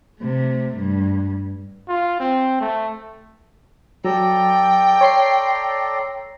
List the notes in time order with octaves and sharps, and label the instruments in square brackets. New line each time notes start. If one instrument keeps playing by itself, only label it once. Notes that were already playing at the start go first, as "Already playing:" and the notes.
[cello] C3 A3
G2
[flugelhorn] F4
C4
A3
[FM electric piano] F#3 [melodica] A4 D5 A#5 [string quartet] G5
[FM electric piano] C#5 C6 C7